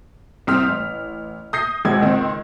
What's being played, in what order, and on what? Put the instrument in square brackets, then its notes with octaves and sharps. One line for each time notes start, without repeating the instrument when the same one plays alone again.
[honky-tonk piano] C2 C4 D#6 F6 B6
A1
D#6 G6 A#6 C7
G#1 B2 G#3 G#6
C#2 D#3 C4